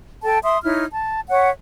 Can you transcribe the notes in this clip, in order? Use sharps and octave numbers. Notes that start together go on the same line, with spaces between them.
A4 G5 A5
E5 C6 D#6
D#4 E4 C#5 F6
A5
C#5 E5 F#5